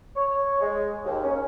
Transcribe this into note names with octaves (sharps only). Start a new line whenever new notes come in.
C#5
G#3
D#2
C#4